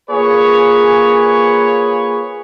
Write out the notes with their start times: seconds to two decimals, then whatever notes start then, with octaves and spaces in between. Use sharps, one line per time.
0.10 A#3 F4 G#4 B4 C#5